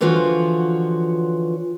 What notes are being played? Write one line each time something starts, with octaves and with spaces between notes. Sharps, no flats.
D3 E3 F3 F4 F#4 C#5